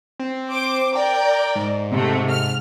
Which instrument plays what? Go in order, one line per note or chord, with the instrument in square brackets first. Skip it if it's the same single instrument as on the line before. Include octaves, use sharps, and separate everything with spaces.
[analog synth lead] C4
[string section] C5 D6
[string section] A#4 D5 [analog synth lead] G5
[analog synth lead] G#2
[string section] C3 A3
F6